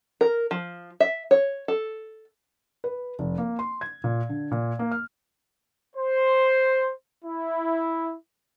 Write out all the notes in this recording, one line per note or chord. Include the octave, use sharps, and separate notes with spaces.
A#4
F3
E5
C#5
A4
B4
F1
A#3
C6
G#6
A#2
D3
A#2
A#3
F6
C5
E4